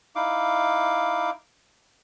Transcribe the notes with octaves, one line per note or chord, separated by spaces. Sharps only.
D#4 E4 F5 D6